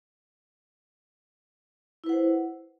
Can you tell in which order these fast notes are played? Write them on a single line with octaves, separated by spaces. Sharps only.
E4 B4 F#5 C5